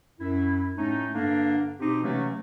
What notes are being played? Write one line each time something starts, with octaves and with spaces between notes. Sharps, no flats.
F#2 E4
A2 A3 C#4 D#4
G2 D3 A#3 D4
B2 C4 D#4 G4
C3 E3 F#3 A3 A#3 C#4